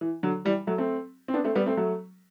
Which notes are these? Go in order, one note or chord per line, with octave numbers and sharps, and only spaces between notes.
E3
D3 F#3
E3 G3
F#3 A3
A3 C4
C4
B3 D4
A3 C4
G3 B3
A3 C4
F#3 A3